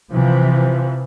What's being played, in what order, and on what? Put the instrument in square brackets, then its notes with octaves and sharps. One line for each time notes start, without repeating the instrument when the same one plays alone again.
[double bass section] C3 E3 F3